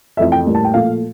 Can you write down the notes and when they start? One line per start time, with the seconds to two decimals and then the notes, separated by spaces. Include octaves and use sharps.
0.17 F2 E3 A3 E5
0.32 G5
0.46 A2 G3 A#3
0.55 A5
0.65 G5
0.73 A#2 F3 A3 F5